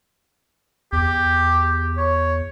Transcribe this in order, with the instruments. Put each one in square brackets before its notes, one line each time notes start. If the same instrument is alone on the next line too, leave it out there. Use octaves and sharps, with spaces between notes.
[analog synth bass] E2 [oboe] G4
[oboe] C#5